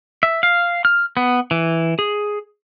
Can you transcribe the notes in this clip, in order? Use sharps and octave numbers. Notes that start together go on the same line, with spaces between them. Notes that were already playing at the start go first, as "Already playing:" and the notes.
E5
F5
F6
B3
E3
G#4